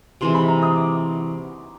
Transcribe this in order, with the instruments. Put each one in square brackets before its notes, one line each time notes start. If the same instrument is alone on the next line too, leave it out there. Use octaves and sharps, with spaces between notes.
[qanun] C3 E3 G#3 [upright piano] C6
[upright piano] B5
A#5
D#6
D6